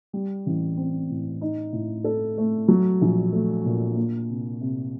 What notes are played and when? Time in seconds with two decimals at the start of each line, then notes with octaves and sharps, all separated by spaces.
0.13 G3
0.46 A1
0.77 C4
1.10 A2
1.41 D#4
1.72 A2
2.04 A4
2.37 A3
2.68 F#3
3.01 A#1
3.33 A3
3.65 A#2
3.96 A#3
4.29 C3
4.61 C3